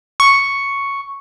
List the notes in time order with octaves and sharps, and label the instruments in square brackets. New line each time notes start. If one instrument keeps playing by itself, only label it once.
[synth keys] C#6